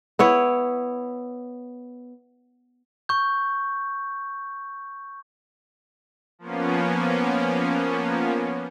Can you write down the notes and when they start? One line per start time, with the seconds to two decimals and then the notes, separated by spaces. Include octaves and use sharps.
0.19 B3 E4 C#5
3.09 C#6 G6
6.39 F3 A#3 B3 C#4